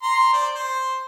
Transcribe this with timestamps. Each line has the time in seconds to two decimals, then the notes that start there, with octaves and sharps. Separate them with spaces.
0.03 A#5 C6
0.33 C5 D5
0.55 C5